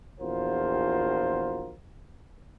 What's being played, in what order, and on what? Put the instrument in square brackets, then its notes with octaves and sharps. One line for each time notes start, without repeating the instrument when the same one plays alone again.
[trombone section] A#1 E2 F4 F#4 A#4 C5